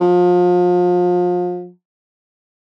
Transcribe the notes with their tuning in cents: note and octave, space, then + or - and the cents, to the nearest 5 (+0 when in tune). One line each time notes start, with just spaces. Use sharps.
F3 +35